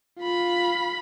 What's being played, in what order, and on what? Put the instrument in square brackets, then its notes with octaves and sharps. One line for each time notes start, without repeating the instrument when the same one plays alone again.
[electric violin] F4 B5